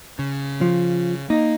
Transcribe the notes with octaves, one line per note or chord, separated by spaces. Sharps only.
C#3
F3
A#3 D#4